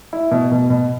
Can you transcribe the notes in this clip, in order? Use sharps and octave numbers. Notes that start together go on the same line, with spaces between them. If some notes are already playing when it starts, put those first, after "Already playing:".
E4
B2
B2
B2